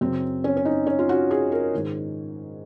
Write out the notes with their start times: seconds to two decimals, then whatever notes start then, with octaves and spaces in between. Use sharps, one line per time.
0.01 F#2 C#3 C4
0.44 C#4
0.57 C#4
0.65 D#4
0.87 C#4
0.99 F4
1.09 F#4
1.31 G#4
1.52 A#4
1.74 G#2 D#3